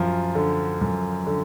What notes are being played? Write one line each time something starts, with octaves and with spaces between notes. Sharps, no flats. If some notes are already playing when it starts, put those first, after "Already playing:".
Already playing: F#2 F3
D3
F#2
D3